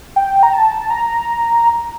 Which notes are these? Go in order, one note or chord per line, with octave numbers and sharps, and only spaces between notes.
G5
A#5
A5
A#5